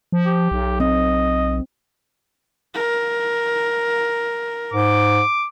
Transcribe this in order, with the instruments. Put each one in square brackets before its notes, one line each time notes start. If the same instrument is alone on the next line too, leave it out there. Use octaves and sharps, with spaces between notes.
[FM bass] F3
[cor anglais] G4
[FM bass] B1
[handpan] C4 [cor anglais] D#5
[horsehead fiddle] A#4
[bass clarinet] G#2 [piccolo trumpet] D6